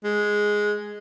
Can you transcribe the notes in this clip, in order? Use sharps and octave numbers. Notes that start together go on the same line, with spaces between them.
G#3